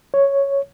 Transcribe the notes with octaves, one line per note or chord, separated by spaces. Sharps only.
C#5